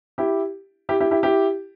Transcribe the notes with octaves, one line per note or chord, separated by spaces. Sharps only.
E4 G4
E4 G4
E4 G4
E4 G4
E4 G4